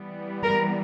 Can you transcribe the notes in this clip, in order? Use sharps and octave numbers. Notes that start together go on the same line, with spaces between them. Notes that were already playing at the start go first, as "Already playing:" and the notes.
Already playing: E3 G3 B3
A#4